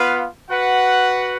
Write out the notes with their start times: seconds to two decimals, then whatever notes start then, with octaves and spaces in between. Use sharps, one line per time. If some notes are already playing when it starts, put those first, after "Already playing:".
Already playing: B3 F4 B4 F5
0.50 F#4 B4 F#5